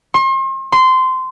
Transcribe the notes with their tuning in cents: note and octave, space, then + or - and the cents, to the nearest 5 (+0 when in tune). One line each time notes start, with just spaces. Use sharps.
C6 +40
C6 -15